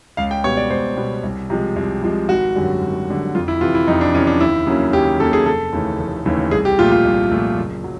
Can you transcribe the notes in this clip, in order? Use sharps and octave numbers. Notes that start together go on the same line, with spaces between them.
C#2 F5
G5
B2 G3 B3 C#5
D5
C#2 C5
B2 G3 B3
C2
C3 F3 G#3
C2
C3 F3 G#3
G#1 F#4
F#2 D3 G3
G#1
F#2 D3 G3
F2 F4
E4
C3 E3 F4
E4
F2 D#4
D4
C3 E3 C#4
D4
D#2 E4
C#3 F#3 A#3 C#4
D#2 G4
C#3 F#3 A#3 C#4 A4
G#4
F1 A4
D#2 C#3 E3 A3
F1
D#2 C#3 E3 A3
C2 G#4
G4
A#2 F3 A3 F4
F4
C2
A#2 F3 A3
F#1
F#3